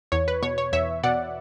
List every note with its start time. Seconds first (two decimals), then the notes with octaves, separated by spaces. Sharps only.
0.12 E2 C#5
0.28 B4
0.43 B2 C#5
0.58 C#5
0.73 E2 C#5 E5
1.03 B2 D5 F#5